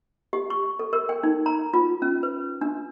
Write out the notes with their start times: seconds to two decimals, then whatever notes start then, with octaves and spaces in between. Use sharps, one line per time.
0.33 G4
0.50 C#6
0.79 A4
0.93 A#4
1.09 G5
1.23 D#4
1.46 A#5
1.74 F4
2.02 C#4
2.23 B4
2.61 D4